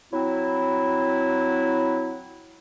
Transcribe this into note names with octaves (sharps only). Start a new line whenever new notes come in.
F#3 C4 E4